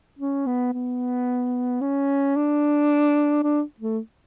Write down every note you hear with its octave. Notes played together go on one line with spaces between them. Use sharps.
C#4
B3
B3
C#4
D4
D4
A3